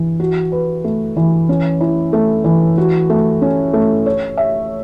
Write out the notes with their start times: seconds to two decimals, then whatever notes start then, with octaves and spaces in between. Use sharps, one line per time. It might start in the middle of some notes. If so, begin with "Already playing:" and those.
Already playing: E3
0.20 F#4
0.52 B4
0.84 A3
1.17 E3
1.49 C#4
1.81 E4
2.13 A3
2.44 E3
2.78 F#4
3.10 A3
3.42 C#4
3.73 A3
4.06 C#5
4.37 E5